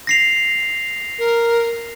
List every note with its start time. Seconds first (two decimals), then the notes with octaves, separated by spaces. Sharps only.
0.07 A#6 C7 F7
1.19 A#4